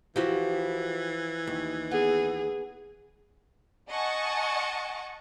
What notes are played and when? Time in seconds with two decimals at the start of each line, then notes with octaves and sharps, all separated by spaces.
0.16 E3 F3 E4 F#4 G4
1.47 D#2
1.91 B3 G#4
3.89 D#5 F#5 G#5 A5 C#6